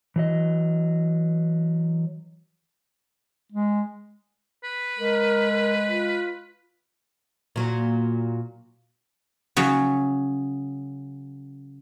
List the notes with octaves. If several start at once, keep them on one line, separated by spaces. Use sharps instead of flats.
E3 F#3 D#5
G#3
B4
G#3 A#4
F4
A#2 F#3
C#3 F#3 C#4